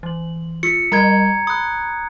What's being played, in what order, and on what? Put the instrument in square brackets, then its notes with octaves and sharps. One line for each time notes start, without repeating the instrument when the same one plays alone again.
[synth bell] E3 F#7
[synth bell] F4 E6 B6 [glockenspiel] C#7
[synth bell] G3 A#4 D#5 [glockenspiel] A#5 G#6
[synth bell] B5 [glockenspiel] D#6 F#6